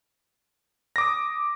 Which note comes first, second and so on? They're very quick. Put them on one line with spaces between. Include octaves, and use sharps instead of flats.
A#6 D6 D#6